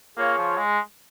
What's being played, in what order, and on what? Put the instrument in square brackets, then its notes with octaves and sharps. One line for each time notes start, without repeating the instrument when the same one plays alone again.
[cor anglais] A#3 [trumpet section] F4 G#4 C#5 F5
[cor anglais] F3
G#3